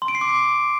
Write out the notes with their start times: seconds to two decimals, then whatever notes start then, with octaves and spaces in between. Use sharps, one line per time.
0.02 C6
0.08 D7
0.15 C7
0.21 D6